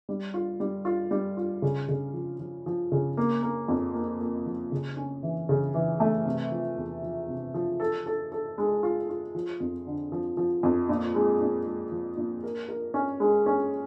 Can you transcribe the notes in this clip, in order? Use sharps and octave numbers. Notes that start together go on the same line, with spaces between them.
G3
F4
G3
F4
G3
F4
C#3
C#3
F3
F3
F3
C#3
A#3
A#3
F2
A#3
A#3
F3
C#3
C#4
E3
C#3
E3
A3
C3
F3
E2
F3
C3
F3
A4
A4
A4
G#3
F4
F4
F3
F2
D3
F3
F3
F2
A#2
G#3
A#2
G#3
F3
A#2
A#4
A#4
C#4
G#3
C#4